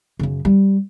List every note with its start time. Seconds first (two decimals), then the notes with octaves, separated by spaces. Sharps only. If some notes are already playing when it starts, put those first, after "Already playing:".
0.19 F#2 C#3
0.45 G3